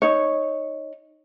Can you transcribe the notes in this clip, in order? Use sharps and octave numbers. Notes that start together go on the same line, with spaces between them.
D#4 C#5